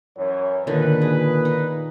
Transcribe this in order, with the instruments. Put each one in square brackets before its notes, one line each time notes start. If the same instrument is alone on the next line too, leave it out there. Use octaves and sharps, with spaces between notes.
[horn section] F#2 E3 [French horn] C#5
[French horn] A#2 [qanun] D3 D#3 [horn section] B4
[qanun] G#4
D#4